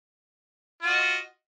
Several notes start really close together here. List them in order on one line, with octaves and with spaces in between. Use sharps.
F4 F#4 D#5